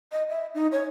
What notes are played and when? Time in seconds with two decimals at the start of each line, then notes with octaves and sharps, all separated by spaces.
0.12 D#5
0.29 E5
0.55 D#4
0.72 C#5